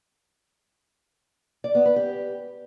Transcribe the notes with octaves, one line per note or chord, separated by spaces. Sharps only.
D5
B3
B4
G4